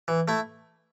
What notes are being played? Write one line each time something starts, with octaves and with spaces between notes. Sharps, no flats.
E3
A3 E4